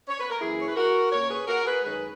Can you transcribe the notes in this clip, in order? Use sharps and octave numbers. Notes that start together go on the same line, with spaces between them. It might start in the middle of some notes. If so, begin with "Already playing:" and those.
C#5
B4
A#4
F#2 E3 A#3 C#4 E4 G#4
C#5
B4
F#4 A#4
A#2 A#3 C#4 A#4 C#5
G#4 B4
F#4 A#4
G#4 B4
F#2 D#3 G#3 C#4 G#4 B4